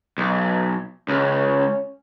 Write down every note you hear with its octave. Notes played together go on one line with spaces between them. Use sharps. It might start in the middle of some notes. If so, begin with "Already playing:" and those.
B1
C#2 C#4